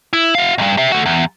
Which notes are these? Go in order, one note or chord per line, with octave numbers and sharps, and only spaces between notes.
E4
F#4 F5
B1 G2
G4 E5
A3 F#4
E2